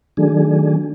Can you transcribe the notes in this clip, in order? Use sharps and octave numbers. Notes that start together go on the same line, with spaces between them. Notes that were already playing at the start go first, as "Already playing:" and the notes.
D#3 F#3 A3 D4 G#4